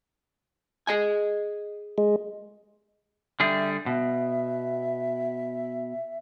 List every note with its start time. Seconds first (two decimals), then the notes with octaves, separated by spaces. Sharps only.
0.87 G#4 D#5 G#5
1.98 G#3
3.40 D3 G3 G#4 E5
3.86 B2 E5